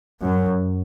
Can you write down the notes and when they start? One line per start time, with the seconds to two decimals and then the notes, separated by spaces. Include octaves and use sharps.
0.22 F#2